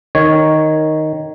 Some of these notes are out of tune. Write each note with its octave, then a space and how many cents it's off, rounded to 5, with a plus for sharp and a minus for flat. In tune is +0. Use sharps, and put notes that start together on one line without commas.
D#3 +0 C#5 -5